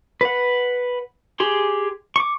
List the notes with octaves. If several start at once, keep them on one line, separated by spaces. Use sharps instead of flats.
B4 F#5
G4 G#4 C6
C#6 D6